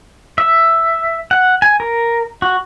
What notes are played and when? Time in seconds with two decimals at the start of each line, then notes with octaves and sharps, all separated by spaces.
0.38 E5
1.31 F#5
1.62 G#5
1.80 A#4
2.42 F#4